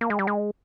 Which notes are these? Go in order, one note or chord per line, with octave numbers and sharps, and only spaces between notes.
A#3
G#3
G3
G#3